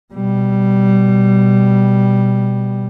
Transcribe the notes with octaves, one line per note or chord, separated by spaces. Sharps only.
B2 G3